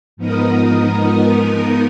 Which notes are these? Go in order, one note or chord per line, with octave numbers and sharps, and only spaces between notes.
G#2 F3 B3 D#4 A#4 D#6